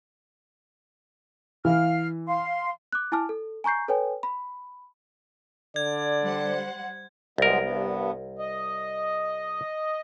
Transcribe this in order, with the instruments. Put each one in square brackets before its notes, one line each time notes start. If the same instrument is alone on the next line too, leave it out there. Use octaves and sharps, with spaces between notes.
[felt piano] E3 [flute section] F5 F6
[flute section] F5 C6
[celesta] D6 F#6
E4 G#5 A5 D6 F6
A4
G#5 A#5 C#6 G6 C7
A4 B4 C#5 G5 G#5
B5
[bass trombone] D3 [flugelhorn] D5 [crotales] G#6
[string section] G3 C5 F#5
[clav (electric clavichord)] C2 A#4 [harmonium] F#3 G#3 B3
[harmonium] G2 B3
D#5